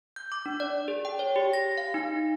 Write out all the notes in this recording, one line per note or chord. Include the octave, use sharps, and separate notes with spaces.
G6
D6
D4
D5
G#4
G5
C#5
G4
A#6
F5
D#4